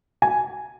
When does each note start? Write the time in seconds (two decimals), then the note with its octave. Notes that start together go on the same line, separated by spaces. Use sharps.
0.22 G#5